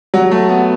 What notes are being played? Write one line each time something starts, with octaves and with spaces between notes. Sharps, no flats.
F#3
A3
B3